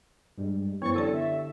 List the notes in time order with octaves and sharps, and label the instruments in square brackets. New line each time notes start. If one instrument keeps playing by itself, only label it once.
[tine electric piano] G2 G3 G#3
[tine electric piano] F#2 E3 C#5 [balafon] B3 C5 [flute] C#6
[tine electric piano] D3 [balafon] E4 G4 D5 [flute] A4
[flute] E5